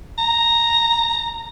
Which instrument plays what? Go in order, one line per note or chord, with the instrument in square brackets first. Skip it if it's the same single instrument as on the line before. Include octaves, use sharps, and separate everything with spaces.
[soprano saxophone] A#5